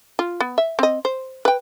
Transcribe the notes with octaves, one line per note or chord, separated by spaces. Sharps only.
F4
B3
E5
C4 D#5
C5
B4 G5